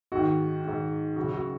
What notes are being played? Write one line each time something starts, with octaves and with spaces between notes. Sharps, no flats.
G#2 D#3 F#4
G#2 D#3
F#2 C#3 F#4
F#4